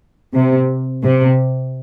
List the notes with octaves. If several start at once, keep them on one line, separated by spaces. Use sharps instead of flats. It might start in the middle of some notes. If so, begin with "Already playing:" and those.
C3
C3